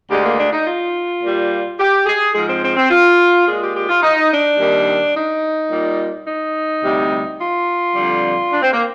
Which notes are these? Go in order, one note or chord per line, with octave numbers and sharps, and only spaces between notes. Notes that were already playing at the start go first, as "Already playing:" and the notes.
D2 D3 G#3 G4
A#3
D4
D#4
F4
A#2 G3
G4
G#4
G#2 F3 G#3 G#4
C4
C4
C4
F4
A#2 G#3 G#4
G4
G4
F4
D#4
D4
D#2 D#3 G3
D#4
A#2 G3
D#4
D2 C3 G3
F4
F2 D3 G3
D4
C4
A#3